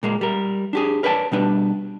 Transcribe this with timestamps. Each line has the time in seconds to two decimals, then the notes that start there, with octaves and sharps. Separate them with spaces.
0.03 A#2 G#3 A#3
0.21 G3 A#4
0.73 D4 G4 G#4
1.03 A#4 B4 C#5 D5 G5 A5
1.32 B2 G3 D4 B4